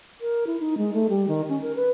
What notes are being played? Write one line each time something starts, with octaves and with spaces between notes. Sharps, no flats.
A#4
E4
D#4
G#3
A3
G3
D#3
C#4
A#4
B4